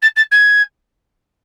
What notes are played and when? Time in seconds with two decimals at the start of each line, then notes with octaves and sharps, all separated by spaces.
0.02 A6
0.16 A6
0.31 G#6